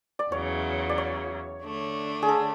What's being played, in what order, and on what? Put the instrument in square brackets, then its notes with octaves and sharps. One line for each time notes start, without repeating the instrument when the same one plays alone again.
[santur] D5
[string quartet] E2 C#3 F#3 [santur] C#5
[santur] D5
C#5
[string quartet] D3 A3 D4
[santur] G#4
A4